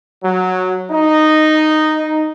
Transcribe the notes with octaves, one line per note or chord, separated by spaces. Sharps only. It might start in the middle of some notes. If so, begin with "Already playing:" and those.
F#3
D#4